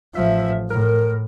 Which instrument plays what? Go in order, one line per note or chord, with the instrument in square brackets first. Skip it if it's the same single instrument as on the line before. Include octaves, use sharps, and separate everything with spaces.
[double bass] A1 F3 [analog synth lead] E5
[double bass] A2 [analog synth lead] A#4